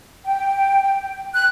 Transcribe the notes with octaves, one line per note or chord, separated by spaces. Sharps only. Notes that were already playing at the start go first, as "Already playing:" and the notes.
G5
F#6